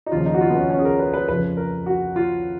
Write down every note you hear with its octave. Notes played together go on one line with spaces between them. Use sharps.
D#4
D#2 C#3 F3 F4
D#4
F#4
F4
B3
C#4
C#4
G#4
A#4
B4
B4
F2 C#3 F3 B4
A#4
F#4
F4